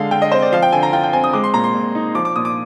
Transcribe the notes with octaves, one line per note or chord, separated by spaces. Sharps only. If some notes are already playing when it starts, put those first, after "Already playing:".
Already playing: D3 G#3 F5
D3 G5
D#5
C4 C5
D5
F3 F5
G5
D3 G#5
A#5
F4 G5
G5
C4 G#5
D#6
G#3 D6
C6
A#2 A#5
C6
A#2
D#4
F3 D6
D6
A#2 D#6
D6